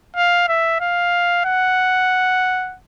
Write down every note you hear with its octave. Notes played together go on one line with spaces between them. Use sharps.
F5
E5
F5
F#5